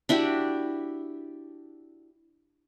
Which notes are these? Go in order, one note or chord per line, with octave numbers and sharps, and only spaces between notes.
D4 E4 F#4 G4